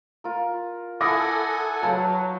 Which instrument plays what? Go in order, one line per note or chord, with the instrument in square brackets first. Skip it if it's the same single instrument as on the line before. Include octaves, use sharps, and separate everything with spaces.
[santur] F4 A#4
[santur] E4 [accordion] A4 F#5 G#5 [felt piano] D6 D#6 A#6
[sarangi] F#3 [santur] B4 F5 G5 [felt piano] A5